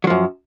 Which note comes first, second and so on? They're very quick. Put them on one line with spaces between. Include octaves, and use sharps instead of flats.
F#3 F3 F#2